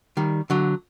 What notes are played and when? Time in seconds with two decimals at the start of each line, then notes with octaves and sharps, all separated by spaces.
0.17 D#3 G3
0.50 D3 F#3